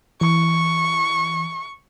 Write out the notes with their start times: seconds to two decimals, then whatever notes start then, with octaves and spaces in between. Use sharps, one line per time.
0.21 E3 C#6